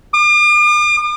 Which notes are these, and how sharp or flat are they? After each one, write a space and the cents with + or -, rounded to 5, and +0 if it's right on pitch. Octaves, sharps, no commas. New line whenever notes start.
D6 +45